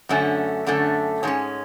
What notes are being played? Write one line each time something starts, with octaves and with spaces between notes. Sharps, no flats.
F#2 D3 A3 C#4
F#2 D3 A3 C#4
G#2 G#3 C#4 C#5